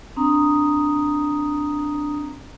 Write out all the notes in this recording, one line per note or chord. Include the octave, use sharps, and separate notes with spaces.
C4 D4 A#5 D#6